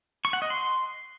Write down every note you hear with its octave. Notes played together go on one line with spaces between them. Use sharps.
C#6
F#5
D#5
C6